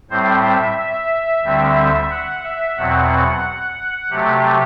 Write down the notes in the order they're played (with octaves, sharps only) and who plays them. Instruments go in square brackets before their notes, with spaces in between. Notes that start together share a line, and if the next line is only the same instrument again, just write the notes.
[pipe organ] A2 G3 C4 C5
E5
E5
D2 D3 G3 C4
F#5
E5
E2 B2 F#3 C4 F#5
C3 F#3 A3 G4